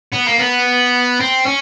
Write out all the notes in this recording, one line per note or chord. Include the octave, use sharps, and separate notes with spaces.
B3
A#3
B3
C4
C#4